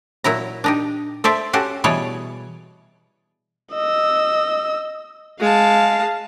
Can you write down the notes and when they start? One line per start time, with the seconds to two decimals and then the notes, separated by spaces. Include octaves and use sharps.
0.24 A#2 F#3 E4 A#5
0.64 D4 D#4 G4
1.24 A4 C5 D5 E5
1.53 C#4 F#4 G4 A4 F#5
1.84 B2 E3 G3 G#4 C#5 D5
3.74 D#5 E6
5.40 G#3 F5 A5